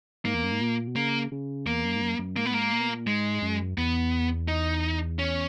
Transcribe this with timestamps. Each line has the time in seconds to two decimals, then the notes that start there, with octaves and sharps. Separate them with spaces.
0.25 G#2 A#3
0.35 E2
0.44 F#2
0.52 G#2
0.61 A#2
0.87 B2
0.96 C#3 A#3
1.32 C#3
1.66 E2 A#3
1.85 F#2
1.96 G#2
2.01 F#2
2.19 F#2
2.37 G#2 A#3
2.44 A#2 B3
2.51 G#2 A#3
2.72 A#2
2.80 B2
2.89 A#2
3.07 G#2 G#3
3.42 F#2
3.78 E2 B3
4.48 D#4
5.19 C#4